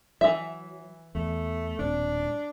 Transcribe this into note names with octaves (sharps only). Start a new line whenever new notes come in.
E3 F#3 E5
E2 A3
D#1 A2 C4 D4